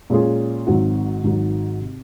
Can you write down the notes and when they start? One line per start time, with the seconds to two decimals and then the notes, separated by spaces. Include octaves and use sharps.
0.10 A#2 G#3 C#4 F4 G#4
0.66 G#1 G#2 F#3 C4 F#4
1.23 G#1 G#2 D#3 F#3
1.80 C3